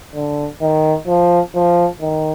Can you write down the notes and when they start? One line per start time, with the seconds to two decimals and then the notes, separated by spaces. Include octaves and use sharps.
0.14 D3
0.62 D#3
1.07 F3
1.55 F3
2.01 D#3